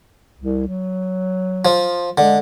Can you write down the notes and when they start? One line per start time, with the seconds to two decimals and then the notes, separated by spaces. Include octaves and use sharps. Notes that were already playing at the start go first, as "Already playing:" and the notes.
0.39 C2
0.68 F#3
1.65 F3
2.18 D3 G#3